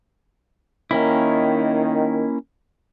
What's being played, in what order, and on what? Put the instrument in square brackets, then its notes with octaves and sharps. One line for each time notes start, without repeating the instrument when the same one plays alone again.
[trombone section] D#3 [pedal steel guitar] A#3 C#4 E4